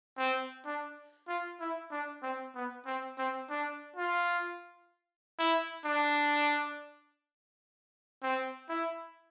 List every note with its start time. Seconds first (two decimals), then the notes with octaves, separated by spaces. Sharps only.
0.18 C4
0.66 D4
1.28 F4
1.60 E4
1.91 D4
2.23 C4
2.55 B3
2.86 C4
3.18 C4
3.50 D4
3.96 F4
5.39 E4
5.85 D4
8.23 C4
8.69 E4